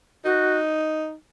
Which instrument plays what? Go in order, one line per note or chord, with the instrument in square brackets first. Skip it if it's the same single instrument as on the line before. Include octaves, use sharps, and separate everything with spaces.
[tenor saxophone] D#4 [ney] F#4